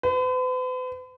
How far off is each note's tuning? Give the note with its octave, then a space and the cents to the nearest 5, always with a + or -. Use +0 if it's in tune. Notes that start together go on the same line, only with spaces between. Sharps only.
B4 +45